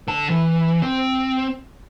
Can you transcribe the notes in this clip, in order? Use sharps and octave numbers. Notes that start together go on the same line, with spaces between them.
D3 A5
E3
C4